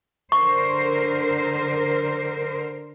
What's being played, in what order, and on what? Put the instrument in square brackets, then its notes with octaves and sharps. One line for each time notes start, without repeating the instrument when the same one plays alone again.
[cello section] D3 A#4 C5 [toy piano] C#6